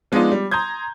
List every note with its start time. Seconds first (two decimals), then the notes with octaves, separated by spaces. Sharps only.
0.12 F3 G#3 B3 D4 D#4 F4
0.32 G3
0.51 A#5 C6 D#6 G6 G#6